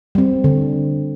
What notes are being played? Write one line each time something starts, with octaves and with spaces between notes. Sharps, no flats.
G3 C4
D3